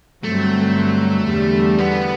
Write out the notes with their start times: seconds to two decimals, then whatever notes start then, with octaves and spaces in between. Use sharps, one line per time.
0.23 G2 D3 F#3 A3 C4
1.27 E2 D3 G3
1.78 B3